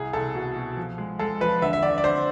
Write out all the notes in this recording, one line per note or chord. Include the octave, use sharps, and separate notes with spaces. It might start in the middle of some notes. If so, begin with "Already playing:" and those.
Already playing: C2 G#4
C2 A4
B2
B2
F3
G#3
G#3 A4
F3 B4
D3 E5
E5
D3 D5
D5
D3 C5